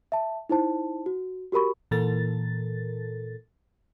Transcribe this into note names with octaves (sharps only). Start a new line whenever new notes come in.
E5 A5
D#4 E4 C5 A5
F#4
F#4 G4 A#4 B5 C#6
A#2 E3 A4 A#4 A6